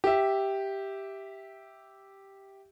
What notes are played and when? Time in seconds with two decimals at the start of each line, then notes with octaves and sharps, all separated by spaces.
0.04 G4 E5